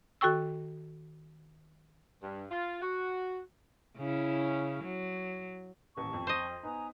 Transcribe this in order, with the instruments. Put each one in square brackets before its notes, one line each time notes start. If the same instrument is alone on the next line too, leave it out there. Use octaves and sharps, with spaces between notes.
[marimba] D#3 F#4 A4 G5 C#6 E6
[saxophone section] G2
F4
F#4
[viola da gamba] C#3 C#4 E4
F#3
[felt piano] D#1 A1 [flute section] A5 C#6
[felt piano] F2
[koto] C5 D#5
[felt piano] B3 D#4 [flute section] G#5 A#5 D#6